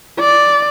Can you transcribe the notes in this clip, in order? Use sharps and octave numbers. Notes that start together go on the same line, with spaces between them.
D5